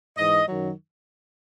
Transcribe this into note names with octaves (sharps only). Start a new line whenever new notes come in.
G#2 E3 D#5
F#2 D#3 F#3